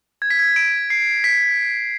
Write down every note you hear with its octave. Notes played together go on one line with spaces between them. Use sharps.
G#6
B6
G#6
D7
C7
B6